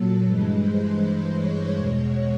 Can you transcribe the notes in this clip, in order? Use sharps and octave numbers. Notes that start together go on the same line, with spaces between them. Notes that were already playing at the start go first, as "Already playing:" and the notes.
Already playing: A#2 F#3 A4
G2 E3 G#3 B4
C5
C#5
E2 B2 G#3 C#5